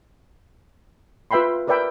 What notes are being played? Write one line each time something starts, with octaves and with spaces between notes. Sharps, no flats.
F4 B4 E5 G5 B5 C6
A#4 B4 D5 E5 G5 B5